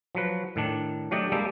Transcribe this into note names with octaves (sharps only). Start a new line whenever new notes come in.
F3 F#3 B4
A2 D#3 D4
F#3 A3 D4 G4 D5 D#5
G3 G#3 A#3 G4 A4